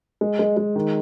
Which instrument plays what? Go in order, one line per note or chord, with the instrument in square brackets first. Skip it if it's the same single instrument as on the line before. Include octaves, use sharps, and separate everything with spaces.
[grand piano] G#3
G#3
G#3
D#3